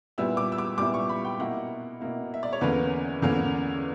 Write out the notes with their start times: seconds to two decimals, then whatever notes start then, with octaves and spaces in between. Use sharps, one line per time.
0.18 A#2 G3 B3 E4 E6
0.37 D6
0.52 E6
0.58 D6
0.78 A#2 G3 B3 E4 D6
0.94 C#6
1.09 B5
1.25 G5
1.39 B2 A#3 E4 F#5
2.00 B2 A#3 E4
2.34 E5
2.43 D5
2.53 C#5
2.61 E2 D3 A#3 C#4 B4
3.22 E2 D3 A#3 C#4